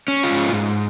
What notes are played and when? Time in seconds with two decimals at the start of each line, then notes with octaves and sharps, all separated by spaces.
0.08 C#4
0.23 F4
0.31 G#2
0.53 G#2